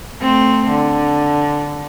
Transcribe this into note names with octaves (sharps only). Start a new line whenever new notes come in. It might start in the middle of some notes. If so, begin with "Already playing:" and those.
A3 C4
D3